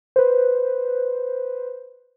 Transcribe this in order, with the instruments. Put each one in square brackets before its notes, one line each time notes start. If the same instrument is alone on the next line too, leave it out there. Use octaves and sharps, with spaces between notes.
[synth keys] B4 C5